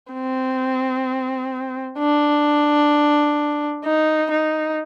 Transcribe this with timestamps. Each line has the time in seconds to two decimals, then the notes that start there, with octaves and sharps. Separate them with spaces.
0.13 C4
1.99 D4
3.85 D#4
4.31 D#4